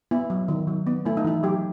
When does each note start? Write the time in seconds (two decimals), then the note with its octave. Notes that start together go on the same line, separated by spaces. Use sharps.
0.11 B3 E4
0.30 F#3
0.48 D#3
0.67 F#3
0.87 B3
1.05 A3 E4
1.17 D#4
1.24 E3 E4
1.43 F#3 G4